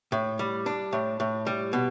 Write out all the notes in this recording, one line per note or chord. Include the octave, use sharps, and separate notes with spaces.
A2
G3
D4
A2
A2
G3
B2